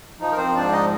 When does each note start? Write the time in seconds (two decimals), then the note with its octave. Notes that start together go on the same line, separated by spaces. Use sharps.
0.20 F3 D#4
0.32 A#4
0.37 C4 C5
0.55 G#2 D4 D5
0.72 D#4 D#5